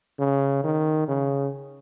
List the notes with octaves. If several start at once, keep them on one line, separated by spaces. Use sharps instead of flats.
C#3
D#3
C#3